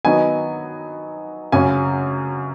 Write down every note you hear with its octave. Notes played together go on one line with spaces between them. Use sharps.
D#3 F#3 B3 D#4 G#5
F#2 C#3 F#3 C#4 G#5